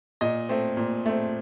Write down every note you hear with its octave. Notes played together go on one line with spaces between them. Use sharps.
A#2 D#5
A3 C4
A#2
A3 C4